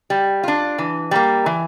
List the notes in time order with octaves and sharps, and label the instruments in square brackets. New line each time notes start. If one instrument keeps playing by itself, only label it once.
[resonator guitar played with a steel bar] G3
D4 F4
E3
G3 A#3
E3